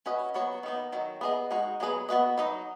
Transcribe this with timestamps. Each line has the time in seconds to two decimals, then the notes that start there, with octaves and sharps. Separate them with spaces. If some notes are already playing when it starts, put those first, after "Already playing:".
0.06 C#4 F#4 B4 D#5
0.34 F#3 B3 F#4 C#5
0.63 D#3 B3 D#4
0.93 D#3 F#3
1.21 B3 G#4 D#5
1.51 G#3 D#4 F#4
1.80 F#3 B3 G#4 B4
2.09 B3 F#4 B4 D#5
2.38 F#3 D#4 B4 D#5